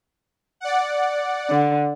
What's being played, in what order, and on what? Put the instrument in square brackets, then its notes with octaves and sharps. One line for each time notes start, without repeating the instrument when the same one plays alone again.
[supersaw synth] D5 F#5
[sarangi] D3